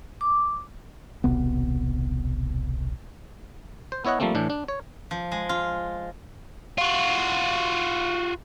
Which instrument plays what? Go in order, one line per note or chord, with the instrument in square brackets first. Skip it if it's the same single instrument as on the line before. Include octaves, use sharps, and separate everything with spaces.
[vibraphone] D6
[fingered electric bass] D#1 B1 C3 B3
[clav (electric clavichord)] C5
B3 E4 C#5 D#5 F#5
F3 G3 A3 A#3 C4
A2 E3 D4
D4
C#5
[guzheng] F3
G#3
F4
[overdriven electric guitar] F4 F#4